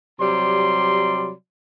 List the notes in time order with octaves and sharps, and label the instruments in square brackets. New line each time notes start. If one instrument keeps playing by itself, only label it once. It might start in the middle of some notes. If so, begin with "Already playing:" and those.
[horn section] C3 F#3 G3 D5 A#5 C6